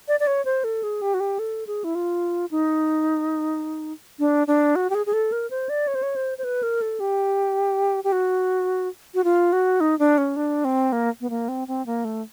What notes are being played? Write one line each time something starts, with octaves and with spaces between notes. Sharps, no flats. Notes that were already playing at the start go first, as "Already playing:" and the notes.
D5
D5
C#5
C5
A4
G#4
G4
F#4
G4
A4
G#4
E4
F4
D#4
D4
D4
F#4
G4
G#4
G#4
A4
A#4
C5
D5
C#5
C5
C#5
C5
C5
B4
A#4
A4
G4
G4
F#4
F#4
F4
F#4
D#4
D4
C#4
D4
C4
A#3
B3
A#3
C4
C4
A#3
A3